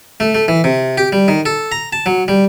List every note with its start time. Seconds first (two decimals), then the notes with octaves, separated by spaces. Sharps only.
0.20 A3
0.35 A3
0.48 E3
0.64 C3
0.98 G4
1.13 G3
1.28 D#3
1.46 A4
1.72 A#5
1.93 A5
2.06 F#3
2.28 G3